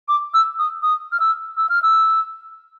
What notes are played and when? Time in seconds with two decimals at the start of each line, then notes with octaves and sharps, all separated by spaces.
0.08 D6
0.34 E6
0.59 D#6
0.82 D#6
1.12 F6
1.20 E6
1.57 E6
1.69 F6
1.83 E6